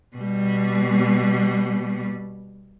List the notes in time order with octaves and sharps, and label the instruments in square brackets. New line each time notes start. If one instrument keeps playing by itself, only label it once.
[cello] B2 G3